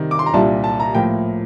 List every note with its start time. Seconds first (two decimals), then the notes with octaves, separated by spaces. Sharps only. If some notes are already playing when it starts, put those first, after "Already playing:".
Already playing: C3 D#3 G3
0.11 D6
0.19 C6
0.26 A#5
0.33 C2 A#2 G3 D4 A5
0.64 A5
0.80 A#5
0.94 A2 F3 A#3 G5